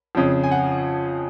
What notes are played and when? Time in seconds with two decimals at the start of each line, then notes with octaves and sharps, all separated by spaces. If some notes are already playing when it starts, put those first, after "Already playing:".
0.15 F2 C#3 F3
0.43 G#5
0.51 F#5